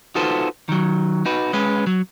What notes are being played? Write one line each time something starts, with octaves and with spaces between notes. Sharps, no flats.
D#4 F4 F#4 A4 B4 C5
D#3 F#3
D#4 F#4 B4
G#3 C#4 B4
F#3